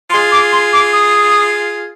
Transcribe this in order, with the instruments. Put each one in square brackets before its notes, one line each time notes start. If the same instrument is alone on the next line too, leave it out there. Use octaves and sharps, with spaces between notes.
[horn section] F4 G#4 [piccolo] C6
[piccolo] D6
C6
D6
D#6